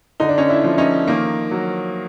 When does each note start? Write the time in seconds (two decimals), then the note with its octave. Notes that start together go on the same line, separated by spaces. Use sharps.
0.20 D3 D#4
0.29 D4
0.38 C#4 D#4
0.49 D4 E4
0.64 F3
0.78 C#4 D#4
1.07 D#3 A#3
1.51 F#3